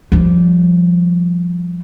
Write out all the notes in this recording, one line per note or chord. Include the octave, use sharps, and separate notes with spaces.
F3 G3